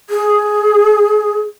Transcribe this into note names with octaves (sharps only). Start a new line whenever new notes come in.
G#4